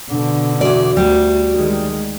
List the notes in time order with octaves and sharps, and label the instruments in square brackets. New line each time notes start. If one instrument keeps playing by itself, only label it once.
[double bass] B2 D3 [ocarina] D4
[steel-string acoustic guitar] E2 D5 [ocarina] F#4
[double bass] D2 [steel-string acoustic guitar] G3
[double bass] D#3 G#3